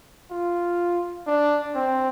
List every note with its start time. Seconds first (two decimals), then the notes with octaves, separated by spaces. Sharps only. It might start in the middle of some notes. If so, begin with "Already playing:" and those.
0.31 F4
1.26 D4
1.75 C4